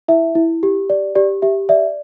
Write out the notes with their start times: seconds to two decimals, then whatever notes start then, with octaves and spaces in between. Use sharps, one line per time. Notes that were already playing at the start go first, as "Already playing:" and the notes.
0.08 E4 E5
0.35 E4
0.63 G4
0.90 D5
1.15 G4 D5
1.42 G4 E5
1.69 D5 E5